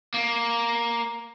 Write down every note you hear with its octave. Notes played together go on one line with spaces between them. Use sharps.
A#3